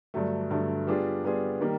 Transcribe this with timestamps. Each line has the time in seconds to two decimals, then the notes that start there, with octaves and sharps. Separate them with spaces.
0.14 G2 D3 F#3 A3
0.50 G2 D3 F#3 A3
0.87 G3 B3 D4 F4 G#4
1.24 G3 B3 D4 F4 G#4
1.61 D#3 G3 A#3